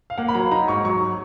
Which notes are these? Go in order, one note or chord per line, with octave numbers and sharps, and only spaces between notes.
F5
A#3 F#5
B5
F#3 A#5
D#4 A#5
G#2 C#6
F#3 C#6